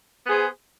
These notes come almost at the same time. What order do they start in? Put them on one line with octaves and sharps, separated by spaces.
B3 G#4 C5